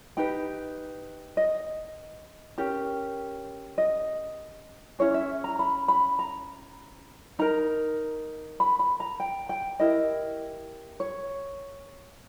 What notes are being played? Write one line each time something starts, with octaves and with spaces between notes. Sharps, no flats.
D#4 G4 B4 G5
D#5
C#4 G4 A#4
D#5
C#4 E4 G#4 C#5
E5
A#5
B5
B5
A#5
D#4 A#4 A#5
B5
B5
A#5
G5
G5
E4 G4 A#4 D#5
C#5